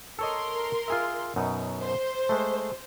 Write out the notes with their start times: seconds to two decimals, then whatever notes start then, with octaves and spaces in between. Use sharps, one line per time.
0.19 A4 A#4 C#5 D#5 C6
0.88 F4 G#4 E5
1.36 F#2 B2 D#4
1.80 C5
2.29 G#3 A3